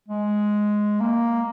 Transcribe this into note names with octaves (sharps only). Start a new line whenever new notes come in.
G#3
A#3